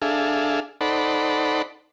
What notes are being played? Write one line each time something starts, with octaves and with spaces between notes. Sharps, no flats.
D4 G#4 A4 E5 F5
D#4 A4 C5 D5 F#5 B5